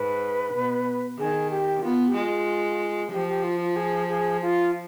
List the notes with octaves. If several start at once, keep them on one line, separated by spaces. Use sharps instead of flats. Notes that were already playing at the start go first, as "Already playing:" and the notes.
Already playing: G#2 B4
B2
D#3 G#4
G4
B3 F4
G4
G#3 F4
F3 G4
G4
F4
F4
G#4
G#4
F4